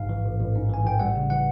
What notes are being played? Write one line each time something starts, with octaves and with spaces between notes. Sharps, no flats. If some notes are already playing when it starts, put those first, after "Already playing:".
Already playing: A1 G#2 F5
E3
A1
A1
G#2
E3 G#5
A1 G5
G3 F#5
C#3
E3 F#5